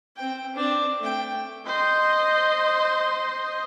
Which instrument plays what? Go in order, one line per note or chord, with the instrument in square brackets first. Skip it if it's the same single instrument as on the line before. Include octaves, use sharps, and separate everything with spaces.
[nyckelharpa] C4 G5
C4 D4
A3 G5
[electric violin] C5 D#5